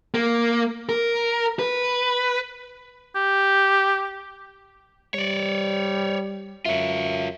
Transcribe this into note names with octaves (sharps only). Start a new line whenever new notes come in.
A#3
A#4
B4
G4
G3 C#5 D5
F#2 F4 C#5 E5